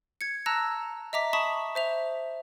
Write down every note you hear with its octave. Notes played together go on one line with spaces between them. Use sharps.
G#6 C#7
A5 A#5 E6 F#6 A#6
D#5 E5 A#5 D6 B6
A5 B5 C#6 D#6 B6 E7
C5 E5 F7